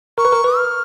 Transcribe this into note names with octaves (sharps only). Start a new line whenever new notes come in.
A#4 C#6
B4
A#4
B4
F6